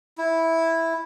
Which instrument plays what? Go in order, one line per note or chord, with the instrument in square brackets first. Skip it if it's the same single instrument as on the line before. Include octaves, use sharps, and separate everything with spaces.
[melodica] E4